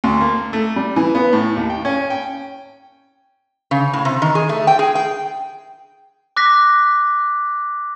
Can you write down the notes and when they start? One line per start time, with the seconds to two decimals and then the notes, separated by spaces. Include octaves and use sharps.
0.04 D2
0.21 A#3
0.53 A3
0.76 G3
0.96 E3
1.15 B3
1.33 A2
1.56 D#2
1.69 G5
1.85 C#4
2.10 G5
3.71 C#3
3.93 A2
4.05 C3
4.22 D#3
4.35 G#4
4.49 A3
4.67 G5
4.79 G#4
4.95 G5
6.36 D6 F#6 A#6 B6